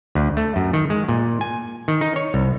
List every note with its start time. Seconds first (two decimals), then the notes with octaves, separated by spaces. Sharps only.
0.15 D2
0.37 A3
0.56 F#2
0.73 D#3
0.90 G#3
1.09 A#2
1.41 G#5
1.88 D#3
2.01 D#4
2.16 C#5
2.34 C2